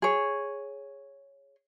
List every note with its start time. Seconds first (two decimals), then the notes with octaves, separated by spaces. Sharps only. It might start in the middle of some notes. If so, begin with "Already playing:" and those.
0.02 G#4 C#5